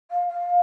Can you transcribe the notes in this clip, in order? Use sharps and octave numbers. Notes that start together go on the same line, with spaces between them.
F5
F5